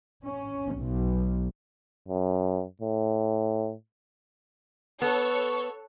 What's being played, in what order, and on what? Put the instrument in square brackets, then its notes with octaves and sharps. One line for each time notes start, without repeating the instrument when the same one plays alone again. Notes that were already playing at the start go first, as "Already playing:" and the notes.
[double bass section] C#4
B1
[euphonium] F#2
A2
[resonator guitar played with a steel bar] B3 [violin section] A4 C#5 C#6